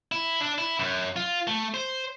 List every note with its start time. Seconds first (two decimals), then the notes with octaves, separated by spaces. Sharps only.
0.12 E4
0.41 D4
0.58 E4
0.79 F#2
1.16 F4
1.47 A3
1.74 C5